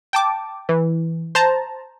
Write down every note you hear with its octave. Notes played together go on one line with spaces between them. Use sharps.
G5 A5 D6
E3
C5 A5 A#5